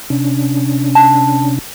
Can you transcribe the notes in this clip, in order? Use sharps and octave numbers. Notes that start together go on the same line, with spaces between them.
C3 C#4 D4
A5